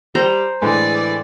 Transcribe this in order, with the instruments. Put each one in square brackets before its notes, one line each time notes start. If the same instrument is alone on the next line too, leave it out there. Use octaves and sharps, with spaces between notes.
[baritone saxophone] G3 [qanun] C5 A#5
[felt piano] A2 D3 G#3 [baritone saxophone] E3 [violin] G#4 D5